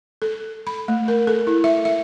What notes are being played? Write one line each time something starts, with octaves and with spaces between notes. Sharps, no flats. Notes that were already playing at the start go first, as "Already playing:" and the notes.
A4
B5
A3
A#4
A4
E4
E5
E5